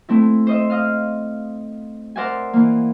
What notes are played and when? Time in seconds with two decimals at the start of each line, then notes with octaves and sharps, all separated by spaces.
0.09 A3 C4 E4
0.47 C5 D#5 E5
0.70 D#5 F5 F6
2.16 A#4 C5 D5 E5 F#5 G#5
2.53 E3 A#3